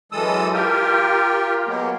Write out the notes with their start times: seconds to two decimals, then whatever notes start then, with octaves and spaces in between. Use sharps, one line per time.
0.12 F#2 E3 G#3 A4 D#6 E6
0.53 F4 G4 A#4 G5
1.68 F#3 G#3 A#3 B3